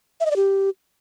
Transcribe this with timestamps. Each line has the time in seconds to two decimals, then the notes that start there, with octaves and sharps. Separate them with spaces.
0.20 E5
0.26 D#5
0.31 D5
0.36 G4